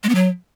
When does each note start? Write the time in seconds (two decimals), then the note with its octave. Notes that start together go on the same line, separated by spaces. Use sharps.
0.03 G#3
0.09 B3
0.15 F#3